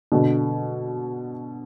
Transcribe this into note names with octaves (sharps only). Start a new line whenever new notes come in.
B2 D3